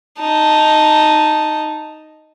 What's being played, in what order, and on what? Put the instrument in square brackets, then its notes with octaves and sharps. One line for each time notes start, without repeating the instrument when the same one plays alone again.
[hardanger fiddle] D#4 A5